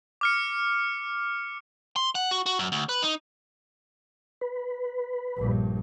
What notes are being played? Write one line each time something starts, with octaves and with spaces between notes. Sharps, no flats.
D6 F6 C#7
C6
F#5
F#4
F#4
F#2
D2
B4
D#4
B4
A#1 G2